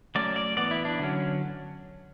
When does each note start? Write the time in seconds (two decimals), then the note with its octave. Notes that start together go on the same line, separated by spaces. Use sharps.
0.15 F#3 A3 C#4 D5
0.36 D5
0.57 E3 B3 D5
0.71 E4
0.85 D4
0.99 D3 F#3 C#4